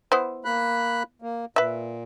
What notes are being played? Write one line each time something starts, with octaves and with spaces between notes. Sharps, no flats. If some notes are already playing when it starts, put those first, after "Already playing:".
B3 E4 C5
A#3 B5 F#6
A#3
A#2 B4 E5